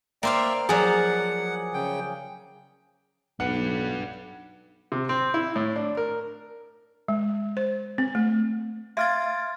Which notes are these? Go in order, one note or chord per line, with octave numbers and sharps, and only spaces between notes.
A#3 C5 D5 E5 F5 G5
F3 F#3 G#4 D5 F#5
C#3 G5
B1 D4 B4 F#5
C3
C4
E4
A2
D4
A#4
G#3
C5
C4
A3
E5 F5 C6 F6 G#6 A6 D7